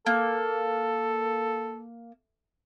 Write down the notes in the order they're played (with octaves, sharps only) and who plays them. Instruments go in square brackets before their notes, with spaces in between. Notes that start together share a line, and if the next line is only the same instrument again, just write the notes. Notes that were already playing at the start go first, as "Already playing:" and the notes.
[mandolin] A#3 [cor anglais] A4